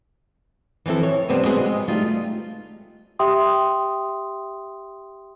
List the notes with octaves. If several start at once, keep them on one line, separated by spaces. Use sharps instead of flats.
E3 F3 C4 E4 A4
C#5
G2 C3 B3 C4 D4
G#3 B3 C4 F#4 G#4 D#5
G#3
G3 A3 D#4 F4
G4 E5 G5 C6 D#6